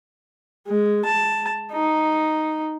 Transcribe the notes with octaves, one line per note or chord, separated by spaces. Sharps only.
G#3
A5
D#4